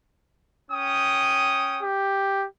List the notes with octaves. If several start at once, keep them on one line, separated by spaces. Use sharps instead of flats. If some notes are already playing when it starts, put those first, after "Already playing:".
C#4 G5 D#6
G4